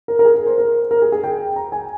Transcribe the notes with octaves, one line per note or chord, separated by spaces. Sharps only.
A#4
A#4
G#4
A#4
C5
A#4
A#4
G#4
G#4
G5
A#5
G#5